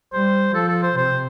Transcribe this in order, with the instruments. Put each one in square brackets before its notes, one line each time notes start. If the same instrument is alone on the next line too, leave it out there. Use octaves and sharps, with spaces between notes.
[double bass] G3 [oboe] C5
[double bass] F3 [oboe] A4
[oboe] A4
C5
[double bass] C3 [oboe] C5